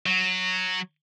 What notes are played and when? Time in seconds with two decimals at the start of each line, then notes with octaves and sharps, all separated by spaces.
0.06 F#3